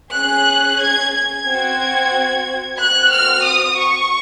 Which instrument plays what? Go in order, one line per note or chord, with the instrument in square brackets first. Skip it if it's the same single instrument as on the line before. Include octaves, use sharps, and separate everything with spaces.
[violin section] C#4 G#4 F#6
G#6
G#6
C4 F#4
C4 F#4 F#6
F6
D#6
C#6